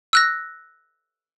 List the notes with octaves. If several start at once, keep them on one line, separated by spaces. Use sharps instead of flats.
E6 F#6 A#6